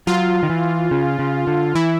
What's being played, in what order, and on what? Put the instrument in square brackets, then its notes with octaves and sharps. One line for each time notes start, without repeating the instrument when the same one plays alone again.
[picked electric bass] F#3 [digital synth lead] F4
[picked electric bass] D#3
E3
C#3
C#3
D3
[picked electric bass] E3 [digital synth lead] E4